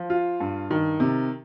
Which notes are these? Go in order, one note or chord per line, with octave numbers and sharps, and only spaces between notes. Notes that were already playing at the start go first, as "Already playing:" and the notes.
Already playing: F3
F4
G2
D#3
C3